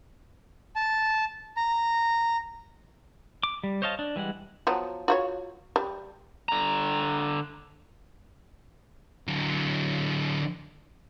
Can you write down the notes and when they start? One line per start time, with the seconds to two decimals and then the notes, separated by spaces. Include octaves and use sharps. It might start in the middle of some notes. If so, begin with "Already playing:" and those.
0.76 A5
1.57 A#5
3.43 D6
3.64 G3
3.82 C5 C#5 D#5 F5 A5
3.99 D4
4.16 E3 G3 G#3 F#5
4.67 F3 F#3 B3
5.08 F4 F#4 C#5
5.76 G3
6.48 D3 A#5
9.28 D3 F#3